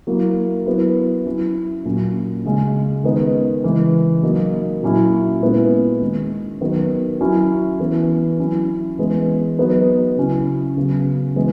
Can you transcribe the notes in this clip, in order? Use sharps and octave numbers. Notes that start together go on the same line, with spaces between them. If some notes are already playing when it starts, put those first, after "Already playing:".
F#3 A#3 E4
F#3 B3 E4
F#3 C#4 E4
A#2 F#3 C#4
C#3 G#3 C#4
D#3 G#3 B3 D#4
C#3 E3 G#3
F#3 A#3 D#4
A#2 F#3 C#4 E4
A#2 G#3 B3 E4
D#3 G#3 C#4
D#3 F#3 B3 D#4
F#3 C#4 E4
E3 B3 E4
F#3 C#4 E4
E3 G#3 B3
F#3 B3 D#4
C#3 F#3 C#4 E4
C#3 F#3 B3
E3 G#3 B3